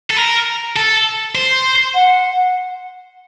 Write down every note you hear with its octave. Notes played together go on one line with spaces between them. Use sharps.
A4
A#4
A4
C5
F#5